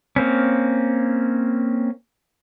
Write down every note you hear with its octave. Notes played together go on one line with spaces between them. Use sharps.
A#3 C4 C#4